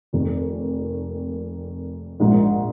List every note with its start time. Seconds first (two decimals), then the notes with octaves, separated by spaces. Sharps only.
0.13 F1 F2 D#3 A#3
2.20 A#1 G#2 F3 A#3